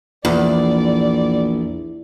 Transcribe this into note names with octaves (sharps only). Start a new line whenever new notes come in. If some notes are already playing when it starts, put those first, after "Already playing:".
A#1 E2 D5